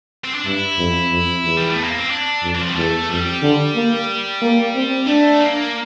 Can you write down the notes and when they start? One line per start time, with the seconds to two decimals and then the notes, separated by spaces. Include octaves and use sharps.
0.24 C4
0.34 D4
0.45 G2 E4
0.78 F2
1.11 F2
1.44 E2
1.57 G3
1.70 A3
1.83 A#3
1.97 C4
2.11 D4
2.43 F2
2.55 E3
2.62 F3
2.69 G3
2.76 E2 A3
3.10 F2 G3
3.42 D3
3.75 A#3
4.42 A#3
4.75 C4
5.07 A3 D4
5.41 A#3